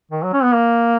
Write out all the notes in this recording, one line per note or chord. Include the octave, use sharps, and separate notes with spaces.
D#3
F#3
C#4
B3
A#3